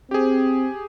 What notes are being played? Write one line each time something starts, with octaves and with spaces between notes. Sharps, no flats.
C4 G4 G#4